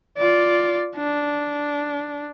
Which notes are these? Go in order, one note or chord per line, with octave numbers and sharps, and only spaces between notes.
F4 D5
D4